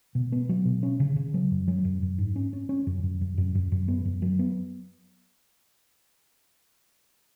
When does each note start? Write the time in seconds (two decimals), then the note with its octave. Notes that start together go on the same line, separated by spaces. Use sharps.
0.15 B2
0.32 B3
0.49 F#3
0.65 B2
0.83 C#4
1.00 C#3
1.16 C#3
1.34 F#3
1.51 F#2
1.68 F#3
1.85 F#2
2.02 F#2
2.18 G#2
2.36 C#4
2.53 C#4
2.69 C#4
2.87 F#2
3.03 F#2
3.21 F#2
3.38 F#2
3.55 F#2
3.72 F#2
3.88 B3
4.05 F#2
4.22 F#3
4.39 B3